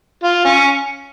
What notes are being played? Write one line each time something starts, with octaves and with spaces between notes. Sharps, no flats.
F4
C#4